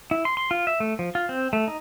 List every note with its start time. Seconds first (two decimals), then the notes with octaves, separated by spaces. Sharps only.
0.11 E4
0.25 C6
0.37 C6
0.51 F4
0.67 E5
0.80 A3
0.99 F3
1.15 F4
1.29 C4
1.53 A3
1.68 D#4